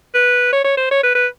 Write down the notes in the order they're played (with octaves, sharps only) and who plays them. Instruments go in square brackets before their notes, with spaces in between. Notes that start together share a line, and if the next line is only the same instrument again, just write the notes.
[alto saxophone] B4
C#5
C#5
C5
C#5
B4
B4